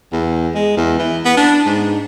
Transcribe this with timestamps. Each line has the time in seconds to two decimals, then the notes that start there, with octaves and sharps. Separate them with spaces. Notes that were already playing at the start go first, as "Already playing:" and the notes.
0.13 E2
0.55 G#3
0.77 E2
0.99 E3
1.25 B3
1.37 D4
1.66 G#2